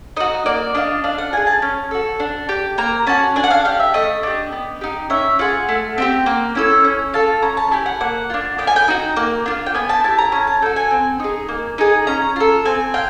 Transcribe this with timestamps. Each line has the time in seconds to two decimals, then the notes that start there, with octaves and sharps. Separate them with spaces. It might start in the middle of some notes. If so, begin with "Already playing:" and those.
0.17 D#4 F#4 D#5
0.46 A#3 D5
0.75 D4 F4 D#5
1.04 D4 F5
1.18 F#5
1.32 F4 G#4 G#5
1.47 A5
1.62 C#4
1.91 F#4 A4
2.20 D4
2.49 G4
2.78 A#3 A#5
3.07 C#4 F#4 A5
3.36 D4 G#5
3.44 F#5
3.51 F5
3.65 G4 F5
3.80 E5
3.94 A3 D#5
4.23 D4 G4
4.52 B3
4.81 D#4 G4
5.10 C#4 E5
5.39 F4 G#4 F#5
5.69 A3
5.98 C4 E4 G4
6.26 A#3
6.55 C#4 E4 A4
6.84 C#4
7.13 F4 A4 A5
7.42 C#4 A#5
7.57 A5
7.71 E4 G4 G#5
7.86 F#5
8.00 A#3 F#5
8.30 D4 F4
8.58 B3 G5
8.67 G#5
8.76 G5
8.88 D#4 F#4
9.16 A#3
9.46 D4 F4
9.66 G5
9.74 B3 G#5
9.89 A5
10.04 E4 G4 A5
10.18 A#5
10.32 C#4 A#5
10.47 A5
10.62 F#4 A4 G5
10.76 G#5
10.91 C4
11.20 D#4 G#4
11.49 A#3
11.78 D#4 G#4
12.07 C#4 A#5
12.36 F4 A4
12.65 C4 G#5
12.94 F4 G5